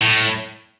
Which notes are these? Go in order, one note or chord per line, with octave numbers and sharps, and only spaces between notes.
A2